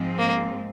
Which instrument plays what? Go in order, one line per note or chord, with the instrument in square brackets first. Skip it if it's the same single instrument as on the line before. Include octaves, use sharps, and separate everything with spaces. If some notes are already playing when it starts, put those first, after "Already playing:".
Already playing: [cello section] G#2 F3 G#3 C4
[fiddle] A#3